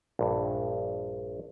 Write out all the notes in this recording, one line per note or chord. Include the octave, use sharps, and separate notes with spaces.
A#1 G2